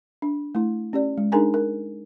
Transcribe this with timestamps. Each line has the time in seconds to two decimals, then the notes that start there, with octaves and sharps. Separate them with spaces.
0.22 D4
0.55 A3 E4
0.93 C#4 G4 D5
1.18 G#3
1.32 D4 D#4 G#4 A#4 G#5 A#5
1.54 A#4